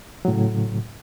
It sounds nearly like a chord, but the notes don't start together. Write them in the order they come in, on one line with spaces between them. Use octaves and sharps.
F#3 A2 C#3